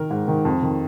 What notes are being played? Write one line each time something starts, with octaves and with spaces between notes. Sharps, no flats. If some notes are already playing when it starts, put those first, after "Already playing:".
Already playing: D#3 A#4
G#2
D#3
F2
D#3